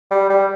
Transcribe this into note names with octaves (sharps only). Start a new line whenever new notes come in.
G3
G3